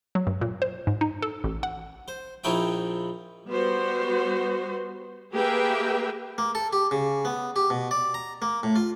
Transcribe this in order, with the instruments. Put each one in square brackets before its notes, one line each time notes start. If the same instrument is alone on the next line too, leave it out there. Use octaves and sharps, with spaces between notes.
[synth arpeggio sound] F#3
G2
A#2
C5
G#2
D#4
A4
A1
F#5
[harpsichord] C5
A#1 F3 D#4 E4 C#5 G5
[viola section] G3 B3 F#4 C5
A#3 G4 G#4 B4 E5 G5
[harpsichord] A#3
A4
G4
C#3
B3
G4
B2
D5
A#5
A#3
A2
F4